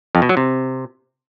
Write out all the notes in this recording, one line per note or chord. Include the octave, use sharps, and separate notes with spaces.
F2
B2
F#3
C3